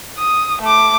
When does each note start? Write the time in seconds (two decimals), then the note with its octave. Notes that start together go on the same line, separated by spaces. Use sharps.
0.18 D#6
0.62 A3 D6